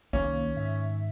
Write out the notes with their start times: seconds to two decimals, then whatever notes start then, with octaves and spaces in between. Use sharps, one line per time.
0.13 C2 D#3 A#3 C#4
0.57 G#2 E5